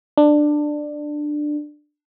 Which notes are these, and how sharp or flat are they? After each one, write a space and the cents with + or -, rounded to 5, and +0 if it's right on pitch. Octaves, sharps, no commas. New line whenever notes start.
D4 +15